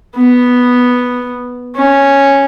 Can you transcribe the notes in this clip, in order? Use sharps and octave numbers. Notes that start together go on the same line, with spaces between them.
B3
C#4